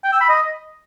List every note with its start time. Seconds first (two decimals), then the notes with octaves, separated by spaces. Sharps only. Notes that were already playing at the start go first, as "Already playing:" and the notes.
0.04 G5
0.12 E6
0.21 B5
0.29 D#5